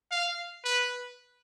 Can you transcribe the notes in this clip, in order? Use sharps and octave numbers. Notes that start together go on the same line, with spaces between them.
F5
B4